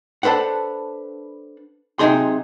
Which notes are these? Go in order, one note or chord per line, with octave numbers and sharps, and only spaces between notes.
D4 A4 B4 C5 F#5
C3 D#3 F#3 D#4 G#4 C6